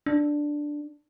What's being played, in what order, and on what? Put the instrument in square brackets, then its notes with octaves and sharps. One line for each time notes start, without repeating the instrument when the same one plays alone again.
[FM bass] D4